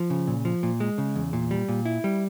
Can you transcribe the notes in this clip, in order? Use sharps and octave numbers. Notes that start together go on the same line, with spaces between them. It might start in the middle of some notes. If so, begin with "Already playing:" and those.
Already playing: F3
C#3
A#2
F3
A#2
G#3
C#3
E2
A#2
G3
A#2
E4
G3